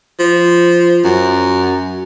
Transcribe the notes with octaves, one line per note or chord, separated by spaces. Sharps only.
F3
F#2